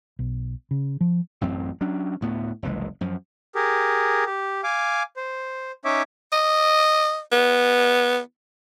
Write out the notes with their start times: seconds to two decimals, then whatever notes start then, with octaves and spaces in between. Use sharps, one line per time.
0.19 B1
0.71 C#3
1.01 F3
1.41 A1 F#2 C4
1.81 F#3 C#4 D4
2.21 D2 A2 B3
2.63 F#1 C2 E3 G#3
3.01 F#2 F3
3.55 G4 G#4 A#4
4.26 G4
4.64 F5 G#5 D6
5.17 C5
5.85 C#4 D#4 C#5 E5 D6
6.32 D#5
7.32 B3